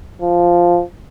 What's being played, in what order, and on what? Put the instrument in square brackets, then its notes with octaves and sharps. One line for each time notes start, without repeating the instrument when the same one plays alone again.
[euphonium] F3